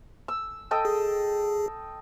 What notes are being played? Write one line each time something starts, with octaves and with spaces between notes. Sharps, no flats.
E6
A4 D#5 G5
G#4